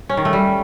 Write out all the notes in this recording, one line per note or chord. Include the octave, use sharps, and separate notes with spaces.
C#4
D#3
A3
G3